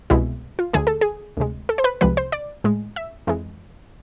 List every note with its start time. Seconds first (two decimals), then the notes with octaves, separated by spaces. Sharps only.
0.10 C2 B2 G#3 E4
0.59 F4
0.73 D2 D3 A3 G#4
0.87 A4
1.01 G#4
1.37 D2 C3 G#3
1.69 A4
1.78 C5
1.84 B4
2.01 C2 C3 F3 G#3 B4
2.17 C5
2.32 D5
2.64 A2 G#3
2.96 E5
3.27 F2 E3 G#3